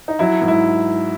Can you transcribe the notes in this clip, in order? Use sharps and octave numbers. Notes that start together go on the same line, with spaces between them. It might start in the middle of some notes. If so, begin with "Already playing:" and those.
D#4
F#3 E4
G#2
E4